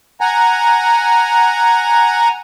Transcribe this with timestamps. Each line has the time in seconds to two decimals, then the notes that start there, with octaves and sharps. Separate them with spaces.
0.21 F#5 G#5 A#5